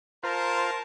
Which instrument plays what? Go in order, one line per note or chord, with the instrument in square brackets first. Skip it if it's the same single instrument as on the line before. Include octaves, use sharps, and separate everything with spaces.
[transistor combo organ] F4 C5 [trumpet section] A#4 A5 A#5